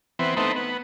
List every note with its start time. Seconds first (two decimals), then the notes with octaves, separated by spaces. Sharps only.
0.19 E3 B3 C4
0.37 A3 B3 C4 D#4
0.56 B3